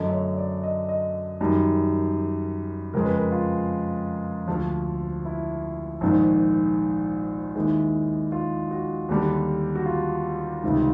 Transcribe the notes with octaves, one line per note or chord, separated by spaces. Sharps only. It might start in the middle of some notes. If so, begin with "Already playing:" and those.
Already playing: F#2 D3 F#3 A3 D#5
C#5
D5
D#5
D#5
F#2 D#3 G3
F2 C#3 F3 G#3 A#4
B4
A#4
F4
D2 D3 F3
E4
A#1 G#2 D#3
D#2 D#3 G#3 E4
F4
F#4
D#2 D3 G3
F#4
F4
C#2 C3 D#3 G3